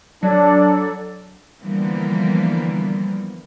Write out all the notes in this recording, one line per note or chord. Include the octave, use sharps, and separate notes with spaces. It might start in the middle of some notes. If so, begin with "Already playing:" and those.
F#3 D4 A4 D5
D3 E3 F3 G3 A#3 B3